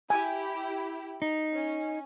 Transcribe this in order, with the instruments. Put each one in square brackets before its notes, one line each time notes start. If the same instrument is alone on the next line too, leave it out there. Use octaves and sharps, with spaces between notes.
[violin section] E4 G4 [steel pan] G#5
[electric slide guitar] D#4
[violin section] C#4